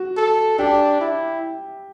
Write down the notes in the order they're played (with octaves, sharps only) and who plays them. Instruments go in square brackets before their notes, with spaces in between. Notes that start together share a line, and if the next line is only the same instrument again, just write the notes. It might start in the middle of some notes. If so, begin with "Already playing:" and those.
Already playing: [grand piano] F#4
[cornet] A4
[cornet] D4 [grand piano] G4
[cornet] E4